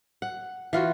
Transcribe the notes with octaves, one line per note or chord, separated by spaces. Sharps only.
F#5
E3 F4 F#4